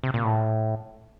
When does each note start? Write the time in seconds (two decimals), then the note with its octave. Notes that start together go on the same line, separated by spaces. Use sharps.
0.04 C3
0.14 A#2
0.24 A2